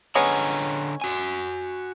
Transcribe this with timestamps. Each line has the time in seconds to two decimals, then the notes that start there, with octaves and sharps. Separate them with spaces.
0.15 D3 G#3 B3 C#4 C#5 A#5
1.01 F#4 G#5